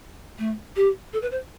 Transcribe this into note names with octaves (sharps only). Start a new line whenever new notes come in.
A3
G4
A4
B4
C5